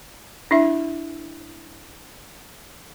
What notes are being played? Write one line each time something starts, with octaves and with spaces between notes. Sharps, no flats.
D4 E4 E5